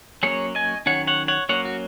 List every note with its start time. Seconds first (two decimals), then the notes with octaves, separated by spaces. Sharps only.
0.23 F#3 A#3 C#4 G#4 C#5
0.55 D#5 G#5
0.86 D#3 F#3 C#4 C#5 F#5
1.07 C#5 F#5
1.28 C#5 F#5
1.49 F#3 A#3 C#4 C#5 F#5
1.65 F#4